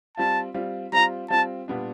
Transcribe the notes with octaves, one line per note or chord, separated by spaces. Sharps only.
G3 C4 F4 A5
G3 C4 F4
G3 C4 F4 A#5
G3 C4 F4 A5
A#2 G3 B3 D4